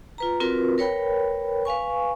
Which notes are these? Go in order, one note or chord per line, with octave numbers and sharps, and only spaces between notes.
F4 B4 A#5
C4 F4 F#4 A#4 B4
A#4 B4 C#5 G5 B5
B4 F5 G#5 C#6